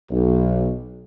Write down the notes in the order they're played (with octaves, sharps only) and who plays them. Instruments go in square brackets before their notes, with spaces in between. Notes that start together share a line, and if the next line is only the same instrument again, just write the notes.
[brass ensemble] B1